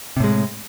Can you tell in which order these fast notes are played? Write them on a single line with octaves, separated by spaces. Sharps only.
C3 A2 G#3